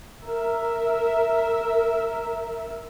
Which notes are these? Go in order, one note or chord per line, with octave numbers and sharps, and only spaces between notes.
A#4 E5